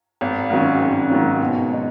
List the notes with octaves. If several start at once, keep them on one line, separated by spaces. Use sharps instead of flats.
G#1
G#2 D#3 F#3 C#4
G#1
G#2 D#3 F#3 C#4
B2
G#3 D#4